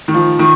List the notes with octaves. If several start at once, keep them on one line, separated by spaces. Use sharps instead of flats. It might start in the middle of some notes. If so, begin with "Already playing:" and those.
D#3
F3
D#3